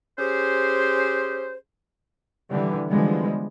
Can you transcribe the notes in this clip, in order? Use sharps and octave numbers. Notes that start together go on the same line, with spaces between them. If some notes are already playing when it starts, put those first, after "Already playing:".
C#4 G4 G#4 C5
D3 E3 G3
D3 E3 F3 G3 G#3 B3